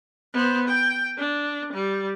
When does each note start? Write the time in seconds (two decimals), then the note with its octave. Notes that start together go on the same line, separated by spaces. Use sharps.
0.33 B3 C5
0.68 G5
1.18 D4
1.73 G3